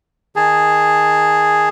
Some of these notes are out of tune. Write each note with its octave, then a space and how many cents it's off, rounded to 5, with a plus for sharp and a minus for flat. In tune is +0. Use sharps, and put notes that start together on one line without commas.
D#3 +0 G#4 +0 A5 +15